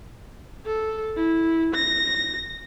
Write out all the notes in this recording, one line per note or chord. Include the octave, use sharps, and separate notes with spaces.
A4
E4
A#6